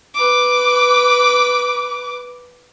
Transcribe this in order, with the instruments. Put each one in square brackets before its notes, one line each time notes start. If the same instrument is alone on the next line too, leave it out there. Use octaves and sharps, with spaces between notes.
[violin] B4 D6